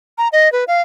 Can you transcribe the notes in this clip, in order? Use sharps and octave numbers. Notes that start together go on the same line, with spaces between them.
A#5
D#5
B4
F5